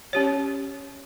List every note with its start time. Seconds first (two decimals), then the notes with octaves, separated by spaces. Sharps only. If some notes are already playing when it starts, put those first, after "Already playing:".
0.13 C#4 G4 C#5